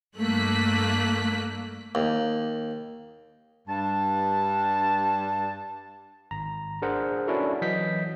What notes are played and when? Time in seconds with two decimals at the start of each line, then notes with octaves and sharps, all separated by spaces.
0.18 G2 A3 A#3 F#6 B6
1.95 D#2
3.68 G2 A5
6.31 G#1 A#5
6.82 D4 G#4 A#4 C5 F#5
7.27 C#4 D4 E4 F#4 A4
7.62 E3 F#3 D#5 G6 B6